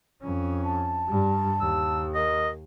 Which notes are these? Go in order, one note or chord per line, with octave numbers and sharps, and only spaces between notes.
F2 C#4
A5
G2 G3
D#2 E6
A#4 D#5